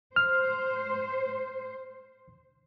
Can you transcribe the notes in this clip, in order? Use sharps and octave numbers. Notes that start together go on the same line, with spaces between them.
C5 F6